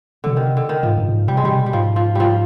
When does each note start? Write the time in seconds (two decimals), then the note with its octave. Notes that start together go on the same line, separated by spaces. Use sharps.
0.24 B2 D3
0.36 C3 D#3
0.57 D3
0.69 D#3
0.83 G#2 F3
0.98 G2
1.09 G2
1.13 G#2
1.28 C3 G3
1.37 G#3
1.44 C3 G3
1.59 B2
1.66 G3
1.73 G#2 F3
1.96 F3
2.15 F3 G3